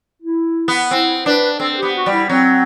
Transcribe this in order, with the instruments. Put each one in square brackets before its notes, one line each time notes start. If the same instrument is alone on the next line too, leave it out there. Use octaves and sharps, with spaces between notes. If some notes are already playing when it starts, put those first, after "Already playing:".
[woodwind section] E4
[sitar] B3
[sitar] C4 [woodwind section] E4
[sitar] D4 [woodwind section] B4
[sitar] C4 [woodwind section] A4
[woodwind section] G4
[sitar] B3
[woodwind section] F#4
[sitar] G3
[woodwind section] E4
[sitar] F#3 [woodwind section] C4